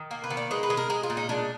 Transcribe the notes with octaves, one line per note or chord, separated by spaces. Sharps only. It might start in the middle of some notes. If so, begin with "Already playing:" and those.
Already playing: D#3
A#3 A#4
B4
D#3
D5
G#3 B4
B4
G#3
A#4
G#3 G#4
F4
A#2
D#4
G#3 D4